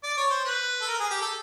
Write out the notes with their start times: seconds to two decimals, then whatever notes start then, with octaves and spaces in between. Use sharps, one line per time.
0.03 D5
0.17 C#5
0.31 C5
0.45 B4
0.81 A4
0.88 A#4
1.00 G#4
1.10 G4
1.21 A4